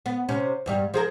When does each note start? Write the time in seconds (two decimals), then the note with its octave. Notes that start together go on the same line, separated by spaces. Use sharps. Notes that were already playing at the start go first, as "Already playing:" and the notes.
0.06 B3
0.29 C3 C#4
0.66 E2 G2 G3
0.94 F3 G#4 A#4